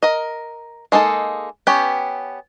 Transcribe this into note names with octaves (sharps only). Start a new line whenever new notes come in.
A#4 D#5
G#3 A#3 D#4 A4
B3 C#4 G4 G5